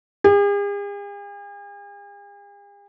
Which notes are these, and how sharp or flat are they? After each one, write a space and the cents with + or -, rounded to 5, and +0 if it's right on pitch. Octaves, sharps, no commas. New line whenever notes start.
G#4 -45